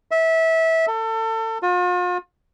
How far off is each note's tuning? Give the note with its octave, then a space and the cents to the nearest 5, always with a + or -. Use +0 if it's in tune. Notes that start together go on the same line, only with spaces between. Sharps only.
E5 -20
A4 +30
F4 +40